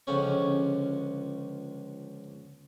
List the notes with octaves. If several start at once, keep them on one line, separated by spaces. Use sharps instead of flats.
C#2 D3 F3 C#4 C#5